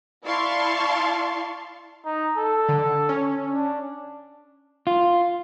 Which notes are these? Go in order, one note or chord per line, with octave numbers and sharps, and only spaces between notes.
E4 D5 F5 A5 C6 C#6
D#4
A4
D3
C#4
D4
F4